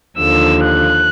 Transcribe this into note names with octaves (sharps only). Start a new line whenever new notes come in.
D#2 D3 F3 E6
F#6